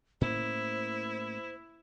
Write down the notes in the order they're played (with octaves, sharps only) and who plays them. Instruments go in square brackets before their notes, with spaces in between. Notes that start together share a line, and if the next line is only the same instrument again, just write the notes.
[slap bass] A2 A#3 C#4 [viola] E4 [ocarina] C5